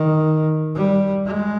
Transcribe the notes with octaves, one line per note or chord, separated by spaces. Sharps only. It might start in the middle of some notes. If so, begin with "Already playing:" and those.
Already playing: D#3
G3
G#3